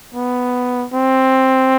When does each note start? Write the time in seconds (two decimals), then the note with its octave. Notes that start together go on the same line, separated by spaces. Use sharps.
0.15 B3
0.93 C4